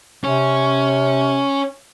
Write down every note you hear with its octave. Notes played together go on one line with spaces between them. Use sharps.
C3 C#4